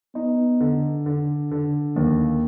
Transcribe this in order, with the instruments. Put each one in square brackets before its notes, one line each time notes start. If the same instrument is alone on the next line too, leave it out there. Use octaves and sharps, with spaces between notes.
[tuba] B3 [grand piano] D#4
[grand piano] D3
D3
D3
[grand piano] D#2 [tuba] A#3